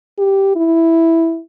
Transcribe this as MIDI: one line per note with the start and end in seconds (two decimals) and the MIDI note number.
0.18 0.56 67
0.56 1.40 64